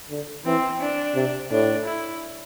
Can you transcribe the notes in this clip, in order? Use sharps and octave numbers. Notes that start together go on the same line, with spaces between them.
D3
E3 C4
D4
C3
A2 D4
E4